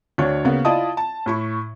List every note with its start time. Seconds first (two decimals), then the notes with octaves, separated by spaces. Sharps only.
0.18 D2 D4 C#5
0.45 C#3 A#3 B3
0.65 E4 F4 D5 D#5 A5 D#6
0.97 A5
1.26 A2 E4 C#6